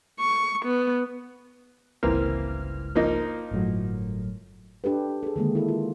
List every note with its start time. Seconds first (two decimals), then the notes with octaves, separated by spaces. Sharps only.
0.20 C#6
0.65 B3
2.03 G1 C#2 E3 A#3 C4 F6
2.95 F3 A#3 D#4
3.51 G1 A2 F#3
4.84 D4 G4 A4 B4
5.23 G#4 A4
5.36 D3 D#3 G#3 A#3
5.55 E4 A4
5.68 F4